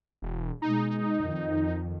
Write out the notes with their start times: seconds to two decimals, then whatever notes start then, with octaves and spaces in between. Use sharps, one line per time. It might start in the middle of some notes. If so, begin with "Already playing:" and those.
0.22 E1
0.62 B2 G#3 D#4
1.24 F2 D#3